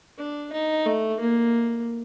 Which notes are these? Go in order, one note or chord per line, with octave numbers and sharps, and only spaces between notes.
D4
D#4
A3
A#3